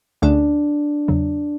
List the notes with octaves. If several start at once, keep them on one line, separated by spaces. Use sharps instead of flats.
D2 D3 A3 C#4 D4 G#4
E2 C#3 F#3